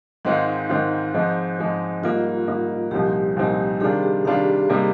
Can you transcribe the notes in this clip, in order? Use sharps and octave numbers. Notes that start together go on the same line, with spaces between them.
G#2 D#3 G#3 C4 D#4 F4
G#2 D#3 G#3 C4 F4
G#2 F3 G#3 C4
G#2 F3 G#3 C4
G#2 G3 A#3 D#4 F4
G#2 G3 A#3 D#4
C2 A#2 F3 C4 D#4 G4
C2 A#2 F3 C4 D#4
C3 D#3 G3 D4 F4 G#4
G4
C3 D#3 G3 D4 F4 F5
C3 G3 A#3 D#4